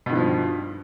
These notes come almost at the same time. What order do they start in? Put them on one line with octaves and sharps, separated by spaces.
B2 G2 D#3 F3